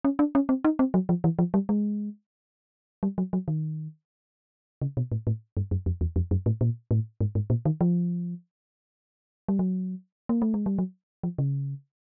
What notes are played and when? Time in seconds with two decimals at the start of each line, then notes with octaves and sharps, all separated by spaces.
0.04 C#4
0.19 D4
0.35 C#4
0.49 C4
0.64 D#4
0.79 C4
0.94 F#3
1.09 F3
1.24 E3
1.39 F3
1.54 G3
1.69 G#3
3.03 G3
3.18 F#3
3.33 F#3
3.48 D#3
4.82 C#3
4.97 B2
5.12 A2
5.27 A2
5.57 G2
5.71 F#2
5.86 F2
6.01 E2
6.16 F2
6.31 F#2
6.46 A2
6.61 A#2
6.91 A2
7.21 G#2
7.35 G#2
7.50 A#2
7.65 D#3
7.81 F3
9.48 G3
9.59 F#3
10.29 A#3
10.42 A3
10.54 G#3
10.66 G3
10.79 F#3
11.23 F3
11.39 C#3